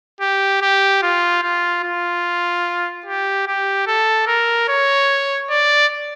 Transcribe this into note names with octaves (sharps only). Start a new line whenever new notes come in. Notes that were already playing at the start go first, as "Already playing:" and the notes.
G4
G4
F4
F4
F4
G4
G4
A4
A#4
C#5
D5